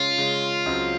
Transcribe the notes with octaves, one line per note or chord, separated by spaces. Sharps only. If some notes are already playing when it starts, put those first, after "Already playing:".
Already playing: C#3 G#3 C#4 F4
C#3 G#3 C#4
C#2 C#3 F#3 C4